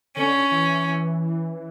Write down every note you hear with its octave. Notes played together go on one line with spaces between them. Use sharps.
D3 C#4
E3